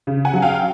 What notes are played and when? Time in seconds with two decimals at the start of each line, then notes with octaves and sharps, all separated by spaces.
0.07 C#3
0.25 F#5 G#5
0.34 F#3
0.42 F5 G5